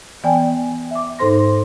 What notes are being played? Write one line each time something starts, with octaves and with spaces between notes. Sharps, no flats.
E3 B3 D5 G5 G#5
E5 D6
G#2 D#4 A4 C5 C6 A#6